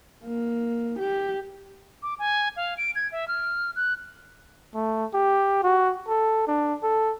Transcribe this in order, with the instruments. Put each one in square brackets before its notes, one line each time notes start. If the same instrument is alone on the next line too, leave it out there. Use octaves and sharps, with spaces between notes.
[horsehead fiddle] A#3
G4
[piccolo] D6
G#5
F5
D7
G#6
E5
F6
F#6
[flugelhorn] A3
G4
F#4
A4
D4
A4